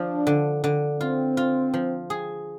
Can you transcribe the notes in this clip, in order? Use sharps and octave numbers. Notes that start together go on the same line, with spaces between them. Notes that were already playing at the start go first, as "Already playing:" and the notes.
Already playing: F3 D4
D3
D3
C4 F4
F4
F3
G#4